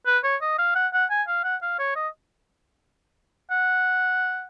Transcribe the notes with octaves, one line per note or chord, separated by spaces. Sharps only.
B4
C#5
D#5
F5
F#5
F#5
G#5
F5
F#5
F5
C#5
D#5
F#5